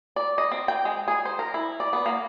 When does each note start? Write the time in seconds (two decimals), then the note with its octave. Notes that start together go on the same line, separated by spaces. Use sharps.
0.16 D5
0.38 D#5
0.51 C4
0.68 G5
0.85 G#3
1.08 G#4
1.25 C5
1.39 A#4
1.54 E4
1.80 D5
1.93 B3
2.06 A#3